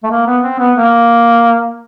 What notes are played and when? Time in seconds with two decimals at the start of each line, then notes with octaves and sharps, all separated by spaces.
0.03 A3
0.11 A#3
0.27 B3
0.43 C4
0.59 B3
0.76 A#3